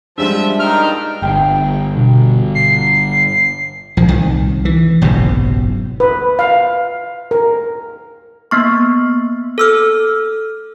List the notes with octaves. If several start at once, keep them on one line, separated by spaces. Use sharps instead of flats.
F3 G3 G#3 D4 E5
G2 A#2 D#4 G5 F6
G1 G5
B2
C7
A#1 F3
C2 D#3
E3
F#1 B1 G#2 C3
B4
F5
A#4
A#3 B3 C#6
A4 E6 F6